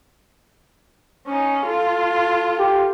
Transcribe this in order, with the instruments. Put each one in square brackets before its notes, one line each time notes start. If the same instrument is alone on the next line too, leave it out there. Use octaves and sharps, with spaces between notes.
[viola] C#4 D#4
F4 A4
[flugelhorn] G4